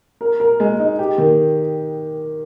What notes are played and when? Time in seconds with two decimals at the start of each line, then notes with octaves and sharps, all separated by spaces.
0.21 A#4
0.40 A#4
0.60 G#3
0.80 D#4
0.99 G4
1.18 D#3